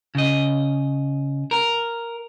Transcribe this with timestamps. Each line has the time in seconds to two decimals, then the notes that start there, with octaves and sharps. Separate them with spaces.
0.15 C#3 D#5
1.51 A#4